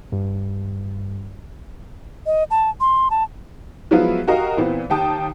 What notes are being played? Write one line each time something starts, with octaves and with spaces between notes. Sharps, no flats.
G2
D#5
A5
C6
A5
F3 F#3 G#3 B3 E4 F4
F#4 G4 A#4 D#5 F5
A#2 E3 B3 C4
D#2 G4 G5 A5 D#6